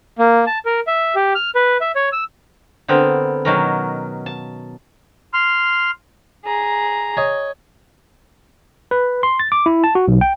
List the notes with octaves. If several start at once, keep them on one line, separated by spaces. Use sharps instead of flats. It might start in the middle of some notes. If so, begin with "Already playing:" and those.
A#3
A5
A#4
E5
G4
F6
B4
E5
C#5
E6
D3 B3 C4 A#4
B2 D#3 F#3 C#4 A#4
A5
C6 F6
G#4 A#5
C#5 D#5
B4
C6
A6
D6
E4
A5
F#4
B1
G5